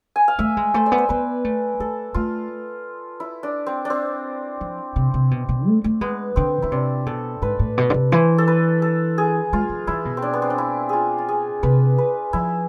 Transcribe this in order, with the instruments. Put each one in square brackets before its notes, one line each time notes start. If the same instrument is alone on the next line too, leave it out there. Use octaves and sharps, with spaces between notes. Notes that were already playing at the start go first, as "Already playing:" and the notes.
[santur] G#5
F5
[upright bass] A3 [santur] E5
[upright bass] G#3
[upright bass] A3 [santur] C5
[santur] D5
[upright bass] B3
[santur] C5
[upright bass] B3 [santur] B4
[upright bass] A3
[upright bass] A3 [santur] A4
[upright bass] A3 [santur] F4
[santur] E4
D4
C4
D4
C4
[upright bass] F3
C3
C3
B2
B2
A3
A3
[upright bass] G#3 [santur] B3
[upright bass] D3 [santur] C4
[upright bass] D3 [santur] E4
[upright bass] C3 [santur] D4
[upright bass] B2 [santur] A4
[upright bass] G#2 [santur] B4
[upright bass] A2
B2
D3
C3
[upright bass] E3 [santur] C5
[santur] A4
B4
A4
G#4
[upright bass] G#3 [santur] F4
[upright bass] F3
[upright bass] E3 [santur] E4
[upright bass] B2
[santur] C4
D4
B3
C4
D4
E4
F4 G#4
F4
G#4
[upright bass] C3 [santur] B4
[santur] B4
[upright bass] F3 [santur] E4